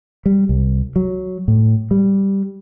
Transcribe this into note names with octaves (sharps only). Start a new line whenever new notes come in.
G3
C2
F#3
A2
G3